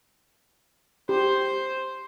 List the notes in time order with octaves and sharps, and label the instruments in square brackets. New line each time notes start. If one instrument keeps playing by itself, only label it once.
[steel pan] G4 [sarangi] C5